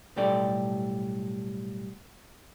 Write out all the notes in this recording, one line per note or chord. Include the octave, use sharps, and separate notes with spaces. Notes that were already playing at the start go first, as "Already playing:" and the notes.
B1 A2 G3 G4 A4 D5